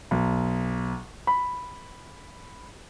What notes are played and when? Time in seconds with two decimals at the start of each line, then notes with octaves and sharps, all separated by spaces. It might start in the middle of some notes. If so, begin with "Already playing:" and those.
0.11 B1
1.27 B5